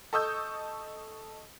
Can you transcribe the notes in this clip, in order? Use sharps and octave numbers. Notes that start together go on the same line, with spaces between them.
A4 D#5 C#6 D#6 E6 G6